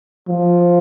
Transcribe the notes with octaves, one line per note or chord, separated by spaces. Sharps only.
F3